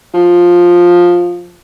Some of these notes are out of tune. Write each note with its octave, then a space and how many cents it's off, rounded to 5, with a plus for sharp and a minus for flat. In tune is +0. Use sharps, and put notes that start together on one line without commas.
F3 +10